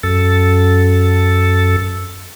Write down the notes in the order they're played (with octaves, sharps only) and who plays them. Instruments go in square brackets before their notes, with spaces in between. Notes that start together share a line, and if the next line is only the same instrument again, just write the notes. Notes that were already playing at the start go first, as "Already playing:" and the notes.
[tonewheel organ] F#2 A4